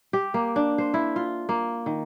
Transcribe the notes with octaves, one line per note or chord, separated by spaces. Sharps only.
G4
A#3
D4
C5
E4
F4
A#3
D#3